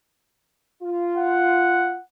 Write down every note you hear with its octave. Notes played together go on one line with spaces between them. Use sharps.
F4
F#5